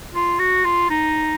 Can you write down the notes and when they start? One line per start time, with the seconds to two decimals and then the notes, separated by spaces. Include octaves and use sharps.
0.14 F4
0.39 F#4
0.65 F4
0.90 D#4